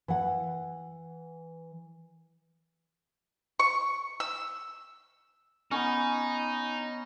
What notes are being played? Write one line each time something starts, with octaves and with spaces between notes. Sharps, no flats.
E3 F#5
C#6
E6
B3 C#4 D#4